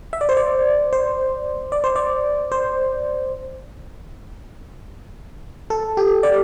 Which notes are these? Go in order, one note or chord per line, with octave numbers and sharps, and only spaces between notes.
E5
D5
C5
D5
C5
D5
C5
D5
C5
A4
G4
D5